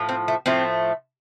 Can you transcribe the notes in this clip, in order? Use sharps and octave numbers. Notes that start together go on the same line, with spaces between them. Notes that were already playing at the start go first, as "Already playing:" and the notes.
Already playing: A2 F3
C4
A3
A2 F3 A3 C4